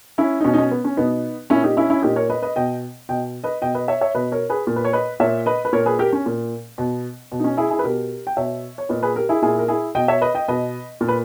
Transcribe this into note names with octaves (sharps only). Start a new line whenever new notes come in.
C#4 E4
D#4
B2 C#4
D#4
C#4
B3
C#4
B2 B3 D#4
A#2 C#4 E4
D#4 G4
C#4 E4
C#4 E4
A#2 D#4 G4
A#4 C#5
B4 D#5
B4 D#5
B2 D#5 G5
B2 D#5 G5
B4 D#5
B2 D#5 G5
B4 D#5
C#5 E5
C#5 E5
B2 B4 D#5
A#4 C#5
G#4 B4
A#2
B4
C#5
B4 D#5
A#2 C#5 E5
B4 D#5
B4
A#2 A#4 C#5
G#4 B4
G4 A#4
C#4
A#2
B2
B2
D#4
C#4
E4 G#4
E4 G#4
B4
B2 G4 A#4
G5
B2 C#5 E5
C#5
A#2 B4 D#5
G#4 B4
G4 A#4
E4 G#4
A#2 E4 G#4
A#4
E4 G#4
B2 D#5 G5
C#5 E5
B4 D#5
D#5 G5
B2 B4 D#5
A#2 A#4
B4